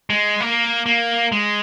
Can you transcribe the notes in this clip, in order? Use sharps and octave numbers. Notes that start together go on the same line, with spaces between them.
G#3
A#3
A#3
G#3